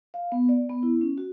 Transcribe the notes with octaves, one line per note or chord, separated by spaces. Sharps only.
F5
B3
D5
B3
E4
C#4
F#4